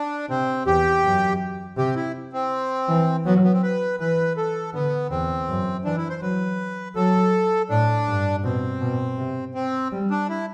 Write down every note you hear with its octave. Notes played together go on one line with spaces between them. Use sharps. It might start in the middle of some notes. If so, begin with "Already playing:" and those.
Already playing: D4
C3 C4
E2 G4
F#2
C3 G4
E4
C4
E3
F#3 B3
B3
C4
B4
E3 B4
A4
D3 B3
E2 C4
F#2
E3 D4
E4
C5
F#3 B4
F#3 A4
A2 D4
G2
B2 C4
B2
C3
C4
G3
D4
E4